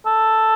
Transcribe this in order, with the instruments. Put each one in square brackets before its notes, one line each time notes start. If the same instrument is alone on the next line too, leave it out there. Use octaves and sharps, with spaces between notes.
[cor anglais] A4